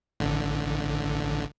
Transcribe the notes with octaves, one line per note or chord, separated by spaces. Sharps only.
A1 D3